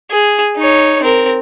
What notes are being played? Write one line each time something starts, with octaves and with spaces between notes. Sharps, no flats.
G#4
D#4 C#5
C4 A#4